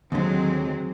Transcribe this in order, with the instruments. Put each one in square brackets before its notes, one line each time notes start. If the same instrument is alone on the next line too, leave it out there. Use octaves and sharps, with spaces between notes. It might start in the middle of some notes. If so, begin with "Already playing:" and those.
[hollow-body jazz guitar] D#2 D3 [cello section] F#3 G#3 C4